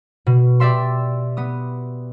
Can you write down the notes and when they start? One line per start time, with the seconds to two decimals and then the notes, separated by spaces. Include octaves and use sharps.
0.26 B2
0.60 G4 D5 E5 C6
1.37 B3 D#6